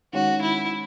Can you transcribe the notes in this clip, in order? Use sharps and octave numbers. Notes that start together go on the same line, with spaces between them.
D#3 G#3 C#4 F#4
E4